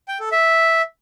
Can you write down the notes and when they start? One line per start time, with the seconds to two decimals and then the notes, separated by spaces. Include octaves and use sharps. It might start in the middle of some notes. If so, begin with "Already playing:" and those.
0.08 G5
0.20 A4
0.32 E5